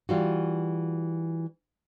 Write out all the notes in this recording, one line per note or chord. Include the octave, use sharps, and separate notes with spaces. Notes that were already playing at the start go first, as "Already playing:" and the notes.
E3 G3 F4 F#4